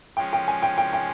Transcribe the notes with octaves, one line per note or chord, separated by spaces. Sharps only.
F3 G#3 C#4 G5
G5
G#5
G5
G5
G5